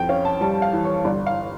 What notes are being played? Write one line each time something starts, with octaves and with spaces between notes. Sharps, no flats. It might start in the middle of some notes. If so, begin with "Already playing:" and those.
Already playing: F2 G5
C#4 F5
A5
G3 A5
F5
E3
C#5
G1 D5
F5